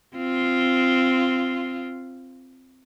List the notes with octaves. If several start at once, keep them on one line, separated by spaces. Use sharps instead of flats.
C4 F4